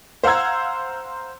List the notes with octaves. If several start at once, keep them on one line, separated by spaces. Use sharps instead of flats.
C5 F5 F#5 A#5 E6 G#6